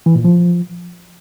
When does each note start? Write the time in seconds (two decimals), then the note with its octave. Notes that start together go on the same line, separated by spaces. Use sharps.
0.06 E3
0.15 A#2
0.24 F3